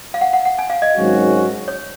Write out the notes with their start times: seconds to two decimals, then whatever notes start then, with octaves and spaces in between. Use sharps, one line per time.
0.14 F5
0.21 F#5
0.33 F#5
0.45 F#5
0.59 G#5
0.70 F5
0.82 D#5
0.95 G#1 G#2 F#3 C#4 F#4
1.68 C#5